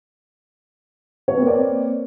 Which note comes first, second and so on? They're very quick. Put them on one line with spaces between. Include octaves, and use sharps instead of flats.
C#5 B4 C4 A#3 D5